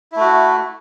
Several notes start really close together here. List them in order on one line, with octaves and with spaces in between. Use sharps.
E4 A3 F#4